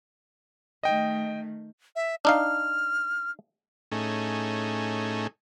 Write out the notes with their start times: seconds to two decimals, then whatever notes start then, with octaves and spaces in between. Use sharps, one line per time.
0.83 D#3 A3 D#5 G5
1.96 E5
2.25 D4 D#4 F5 F6
3.92 A2 A3 C#4 D#4 G#4